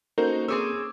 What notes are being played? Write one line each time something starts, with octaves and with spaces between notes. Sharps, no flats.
A#3 C#4 D#4 F#4 A4 A#4 C5 G6
C4 G#4 C#5 D6 E6